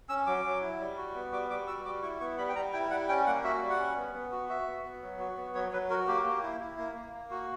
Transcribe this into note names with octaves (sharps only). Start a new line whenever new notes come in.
C#4 E6
F#3 D6
F#3
E4
G3
F#4
B3
G3 D6
G3 D6
F#4 E6
G3 D6
E4 C#6
B3 C#6
G3 B5
G5
G3 A#5
E4 G5
G3 F#5
C#4 G5
A#3 F#5
F#4 E5
G3
F#5
C#4
B3
B3
F#4
F#4 E5
B3
B3
F#3
F#4
B3
F#3 C#5
F#3 B4
F#4 A#4
A#3 G4
A#3
E4
E4
A#3
A#3
A#3
F#4